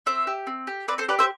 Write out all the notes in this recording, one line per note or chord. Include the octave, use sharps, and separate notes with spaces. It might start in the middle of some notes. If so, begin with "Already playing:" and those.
C4 C5 E5
G4
C4
G4
C4 B4 D5
A4 C5
G4 B4 D5
C5 E5